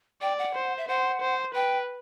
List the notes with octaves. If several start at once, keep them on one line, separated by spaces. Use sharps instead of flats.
D5 G5
F#5
C5
E5
C5 F#5
C5
B4 G5